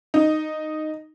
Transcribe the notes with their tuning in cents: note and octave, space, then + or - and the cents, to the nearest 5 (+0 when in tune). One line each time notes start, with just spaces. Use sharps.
D#4 -5